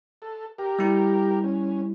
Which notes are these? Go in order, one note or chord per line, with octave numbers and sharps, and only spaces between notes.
A4
G4 A#4
G3 E4
C#4